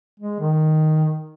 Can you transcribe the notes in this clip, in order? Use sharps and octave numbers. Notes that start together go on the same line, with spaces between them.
G#3
D#3